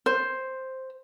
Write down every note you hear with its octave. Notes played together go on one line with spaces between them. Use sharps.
C5